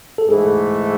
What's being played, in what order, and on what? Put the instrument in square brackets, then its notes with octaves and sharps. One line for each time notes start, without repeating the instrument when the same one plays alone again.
[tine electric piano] A4
[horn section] G#2 E3 A3 [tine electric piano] G#4